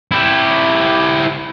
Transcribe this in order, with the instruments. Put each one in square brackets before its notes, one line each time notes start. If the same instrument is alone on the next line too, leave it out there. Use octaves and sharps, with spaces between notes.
[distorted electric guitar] E4 G4